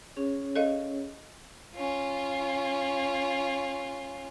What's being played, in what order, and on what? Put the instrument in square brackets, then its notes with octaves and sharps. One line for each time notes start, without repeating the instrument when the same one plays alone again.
[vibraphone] C#4 G#4 C#5
[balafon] A4 D#5 F5
[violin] C#4 F4